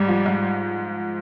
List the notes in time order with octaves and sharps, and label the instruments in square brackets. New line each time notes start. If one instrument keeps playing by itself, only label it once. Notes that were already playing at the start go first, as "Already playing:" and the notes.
Already playing: [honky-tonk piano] G#2 [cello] G3
[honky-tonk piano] F3
G#2